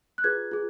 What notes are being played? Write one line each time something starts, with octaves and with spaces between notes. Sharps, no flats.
F#6
F4 G#4 B4 G#6
F4 G#4